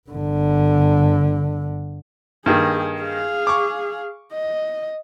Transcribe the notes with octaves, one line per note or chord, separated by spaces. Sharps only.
G1 D3
G2 D#3 A#3 G#4
G#4 F5
C#6 D6
D#5